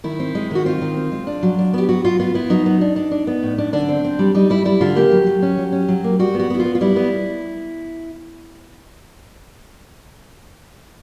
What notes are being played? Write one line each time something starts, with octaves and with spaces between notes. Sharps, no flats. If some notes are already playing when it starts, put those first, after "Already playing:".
D#3 E4
C4
G#3
D#3 F#4
C4 F4
D#3
C4
G#3
D4
F#3
D4
B3 G4
F#3 F#4
B3 F4
B3 F4
B3 E4
F#3 D#4
B3
D4
D4
D4
B3
A2
D4
D3 D4
C4
C4
G3
G3 D#4
G3 E4
G3 E4
D3 F4
A#3 G4
F#3
F#3
C#4
F#3
C#4
F#3
A#3
G3 F#4
B3
F#4
B3 E4
F4
B3
F4
G3 E4
B3